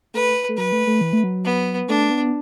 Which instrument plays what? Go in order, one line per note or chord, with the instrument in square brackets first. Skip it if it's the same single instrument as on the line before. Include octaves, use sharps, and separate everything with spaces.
[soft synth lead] A3 [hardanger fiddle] B4
[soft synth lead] A3
[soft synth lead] F#3 [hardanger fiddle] B4
[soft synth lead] A3
A3
E3
A3
F#3
[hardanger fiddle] B3
[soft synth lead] A3 [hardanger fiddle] D4
[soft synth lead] B3